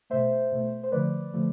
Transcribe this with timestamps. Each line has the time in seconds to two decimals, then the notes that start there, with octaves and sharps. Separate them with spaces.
0.10 B2 A3 C5 E5
0.52 B2 A3
0.83 C5
0.92 D3 F3 A3 B4 D5
1.34 D3 F3 A3